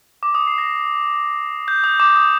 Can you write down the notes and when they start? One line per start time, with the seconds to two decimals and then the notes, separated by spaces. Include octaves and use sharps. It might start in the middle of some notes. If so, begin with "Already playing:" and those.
0.23 D6
0.35 D#6
0.47 C7
0.58 A#6
1.68 G6
1.84 D#6
2.00 D6
2.16 D#6